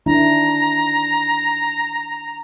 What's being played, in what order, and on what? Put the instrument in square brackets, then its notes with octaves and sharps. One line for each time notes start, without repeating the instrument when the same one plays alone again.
[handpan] D#3 D4 E4 [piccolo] A#5